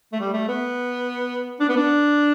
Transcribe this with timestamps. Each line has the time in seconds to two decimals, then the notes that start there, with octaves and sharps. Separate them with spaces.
0.12 A3
0.20 G3
0.33 A3
0.48 B3
1.60 D4
1.69 B3
1.76 D4